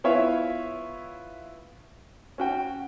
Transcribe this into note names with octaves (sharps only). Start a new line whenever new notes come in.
B3 E4 F4 C#5 E5 F5
C#4 F#4 G5